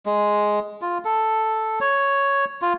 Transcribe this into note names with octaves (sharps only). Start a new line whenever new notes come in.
G#3
F4
A4
C#5
F4